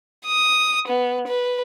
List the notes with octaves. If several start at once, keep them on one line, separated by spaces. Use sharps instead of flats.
D#6
B3
B4